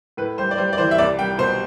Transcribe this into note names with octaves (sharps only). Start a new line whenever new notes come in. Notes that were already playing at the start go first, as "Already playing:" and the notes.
A2 B4
G3 C5
D5
G3 C5
D5
E3 C5
E5
C2 D5
G3 G5
B2 C5